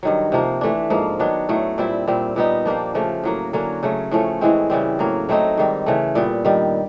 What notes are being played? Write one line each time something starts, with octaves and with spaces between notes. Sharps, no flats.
G2 D#3 F#3
C3 F3 A#3
E3 A3 D4
G#2 F3 A#3
D#3 F#3 B3 D4
A2 F#3 A3
A#2 G3 C4 E4
A#2 G3 C4
A#2 G3 B3 D#4
F3 A#3 D4 G4
C#3 F3 A3
A2 F#3 A#3
D3 F#3 A#3 C#4
C#3 F#3 A3
A2 F3 A3 C#4
A2 E3 G#3 C4
C#3 E3 G3 C4
A2 F#3 A#3
F#3 A3 C4 D#4
G#2 D#3 G3
C#3 E3 A3
A#2 G3 B3
G2 D#3 G3